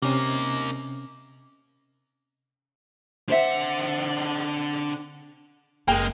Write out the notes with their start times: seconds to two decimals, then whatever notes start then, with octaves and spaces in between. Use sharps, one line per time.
0.02 C3 A#3 C#4 D#4
3.29 D3 C4 C5 E5 F#5
5.88 F#1 G#3 A#3 G#4 G5